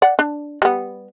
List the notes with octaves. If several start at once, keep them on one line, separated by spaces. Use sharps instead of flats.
D5 F#5
D4
G3 B3